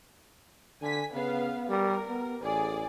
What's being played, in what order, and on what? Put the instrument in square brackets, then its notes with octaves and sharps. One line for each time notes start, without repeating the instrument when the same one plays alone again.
[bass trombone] D3 [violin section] G#5 B6
[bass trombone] C#3 [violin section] B3 F5
[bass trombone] G3 [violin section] A#4
[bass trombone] B3
[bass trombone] A1 [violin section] G#4 D5